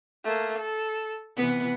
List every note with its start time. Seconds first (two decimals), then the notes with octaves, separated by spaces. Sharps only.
0.24 A3 A#3
0.58 A4
1.37 C3 E3 B3 B4